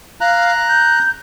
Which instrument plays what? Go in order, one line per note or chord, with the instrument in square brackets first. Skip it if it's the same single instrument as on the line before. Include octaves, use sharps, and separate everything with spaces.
[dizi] F5 [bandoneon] A#5 F#6
[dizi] G6